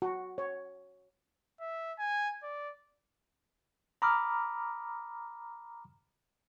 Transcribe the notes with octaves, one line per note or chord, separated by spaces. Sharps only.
F#4
C#5
E5
G#5
D5
A#5 B5 D6 D#6 F6